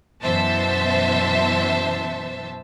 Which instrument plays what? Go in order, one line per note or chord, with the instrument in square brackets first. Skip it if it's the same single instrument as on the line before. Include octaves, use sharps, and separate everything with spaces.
[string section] F#2 B2 E3 C5 E5 A5